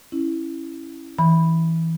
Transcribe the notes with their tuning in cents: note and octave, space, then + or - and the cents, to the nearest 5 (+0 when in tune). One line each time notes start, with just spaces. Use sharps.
C#4 -20 E4 +0
E3 -10 B5 +0